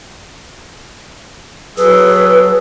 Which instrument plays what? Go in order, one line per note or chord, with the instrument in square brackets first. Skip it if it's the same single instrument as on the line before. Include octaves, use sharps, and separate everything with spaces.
[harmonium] F#3 G#4 A4 [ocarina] B4